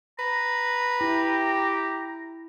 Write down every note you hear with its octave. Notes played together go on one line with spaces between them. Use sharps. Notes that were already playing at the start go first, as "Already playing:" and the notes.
B4 A#5
E4 G4